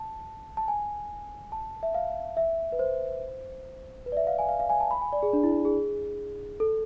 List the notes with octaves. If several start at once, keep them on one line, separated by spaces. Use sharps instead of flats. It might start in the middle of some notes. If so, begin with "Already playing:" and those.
Already playing: A5
A5
G#5
A5
E5
F5
E5
B4
C5
B4
D5
E5
F5
G#5
F5
F5
G#5
A5
B5
G#5
D5
G#4
D4
E4
G#4
A4